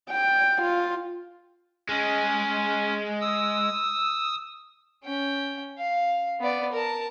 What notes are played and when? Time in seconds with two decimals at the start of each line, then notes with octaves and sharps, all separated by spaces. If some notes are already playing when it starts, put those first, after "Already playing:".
0.10 G5
0.61 F4
1.89 G#3 C#4
3.21 D#6 E6
5.04 C#4 G5
5.79 F5
6.40 B3 D5
6.73 A#4 A5